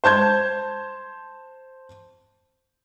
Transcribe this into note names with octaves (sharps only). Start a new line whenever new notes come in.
C5 A5 G6 G#6